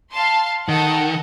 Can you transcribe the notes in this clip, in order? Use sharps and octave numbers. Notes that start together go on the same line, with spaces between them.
F5 A5 C6
D#3 A4 D#5 F#5